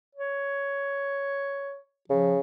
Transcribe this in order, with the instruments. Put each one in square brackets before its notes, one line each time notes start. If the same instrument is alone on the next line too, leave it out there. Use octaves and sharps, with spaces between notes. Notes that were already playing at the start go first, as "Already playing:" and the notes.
[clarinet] C#5
[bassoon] C#3 [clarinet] F3